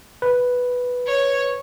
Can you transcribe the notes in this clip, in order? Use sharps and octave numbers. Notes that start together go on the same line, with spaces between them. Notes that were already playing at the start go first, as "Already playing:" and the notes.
B4
C#5